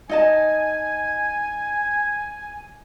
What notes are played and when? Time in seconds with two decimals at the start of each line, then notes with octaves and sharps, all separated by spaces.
0.09 D#4 D#5 G#5 A5